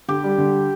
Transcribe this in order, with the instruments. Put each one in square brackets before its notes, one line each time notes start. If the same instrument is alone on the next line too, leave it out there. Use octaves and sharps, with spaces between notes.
[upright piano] D3 [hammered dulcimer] G4
[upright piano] G3
D3